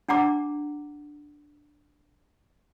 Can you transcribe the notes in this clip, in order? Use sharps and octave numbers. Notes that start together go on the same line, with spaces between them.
D4 F#5 A#5 D6